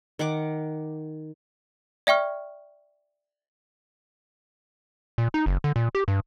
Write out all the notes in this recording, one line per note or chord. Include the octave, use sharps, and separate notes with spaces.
D#3 F#5 D6
D5 E5 G5 C#6 F6
A#2
D#4
F#1
D3
A#2
G4
G2